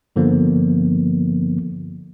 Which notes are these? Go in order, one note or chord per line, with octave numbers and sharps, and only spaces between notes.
G2 D3 F3 A#3 B3